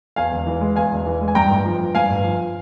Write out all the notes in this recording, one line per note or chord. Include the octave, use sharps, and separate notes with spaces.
E2 F5 G#5
E1
E3
G#3
E2 F5 G#5
E1
E3
G#3
G#5
G2 G5 A#5
G1
F3
G1
G2 F5 G#5
G1
F3